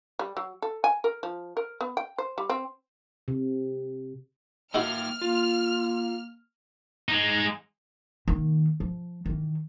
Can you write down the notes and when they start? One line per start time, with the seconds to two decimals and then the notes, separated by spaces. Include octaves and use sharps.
0.19 G3
0.37 F#3
0.62 A4
0.84 G#5
1.04 A#4
1.23 F3
1.57 A#4
1.81 B3
1.97 G5
2.18 C5
2.38 G3
2.50 C4
3.28 C3
4.74 A#3 D#4 E4 F#4 E5 G5 F6
5.22 A#3 F4
7.09 G#3 D#4
8.28 D#3 A#3
8.80 F3
9.26 D#3 E3